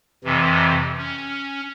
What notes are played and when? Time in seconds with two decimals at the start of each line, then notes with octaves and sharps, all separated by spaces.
0.24 F2 C3 E3
0.98 C#4